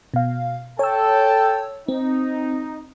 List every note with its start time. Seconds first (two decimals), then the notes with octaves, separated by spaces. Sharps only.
0.14 B2 F5
0.79 A4 C#5 G5 A5 E6
1.88 C4 D#4